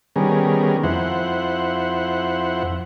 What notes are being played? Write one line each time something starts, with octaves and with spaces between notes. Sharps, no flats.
D#3 G3 B3 C#4 G#4 A#4
F2 E4 C5 F#5